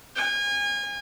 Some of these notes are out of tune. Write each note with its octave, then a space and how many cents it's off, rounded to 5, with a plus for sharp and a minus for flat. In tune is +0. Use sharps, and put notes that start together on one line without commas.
G#5 -35